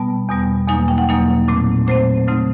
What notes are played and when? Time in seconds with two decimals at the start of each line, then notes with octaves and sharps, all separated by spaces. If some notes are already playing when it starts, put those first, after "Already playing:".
Already playing: B2 G3 B3 A5
0.29 E2 B2 G3 B3
0.68 E2 B2 F#3 A#3 D#4 G#5
0.88 G5
0.98 F#5
1.09 E2 B2 F#3 A#3 D#4
1.48 A#2 F#3 A3 C4
1.87 A#2 F#3 A3 C4 C5
2.27 C#3 F#3 A3 C4 D#4